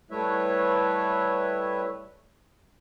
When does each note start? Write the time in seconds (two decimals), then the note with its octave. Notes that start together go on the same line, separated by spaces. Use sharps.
0.11 G3 A3 E4 B4 C#5 E5